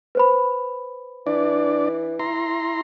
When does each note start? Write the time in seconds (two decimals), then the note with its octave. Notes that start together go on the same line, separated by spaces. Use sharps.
0.15 B4 C5 B5
1.27 E3 D4 D5
2.19 E4 A#5 C6